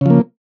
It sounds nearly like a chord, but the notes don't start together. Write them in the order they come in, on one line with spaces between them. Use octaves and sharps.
C#3 F3 A#3